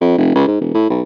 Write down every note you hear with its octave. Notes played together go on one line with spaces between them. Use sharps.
F2
F1
C#2
G#2
E1
A2
B1